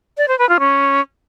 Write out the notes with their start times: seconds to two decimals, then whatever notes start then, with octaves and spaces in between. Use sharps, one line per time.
0.17 D5
0.28 C5
0.39 B4
0.49 F4
0.60 C#4